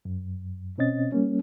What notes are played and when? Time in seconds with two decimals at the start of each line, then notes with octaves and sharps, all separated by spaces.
0.05 F#2
0.78 B2 C4 C#4 D#5 A6
1.12 G3 A#3 C#4